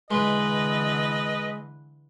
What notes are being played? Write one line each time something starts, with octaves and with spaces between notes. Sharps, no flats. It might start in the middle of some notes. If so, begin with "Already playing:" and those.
D3 E3 G#3 B4 D#5